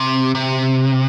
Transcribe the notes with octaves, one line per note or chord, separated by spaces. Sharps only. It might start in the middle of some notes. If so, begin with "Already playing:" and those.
Already playing: C3
C3